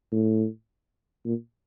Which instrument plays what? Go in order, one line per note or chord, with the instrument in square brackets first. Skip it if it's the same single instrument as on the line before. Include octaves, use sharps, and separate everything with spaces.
[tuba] A2
A#2